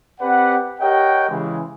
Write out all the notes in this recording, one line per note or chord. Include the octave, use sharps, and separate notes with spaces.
C4 G4 B4 D5 F#5
G4 A#4 C#5 D#5 F#5 G5
C#3 E3 G#3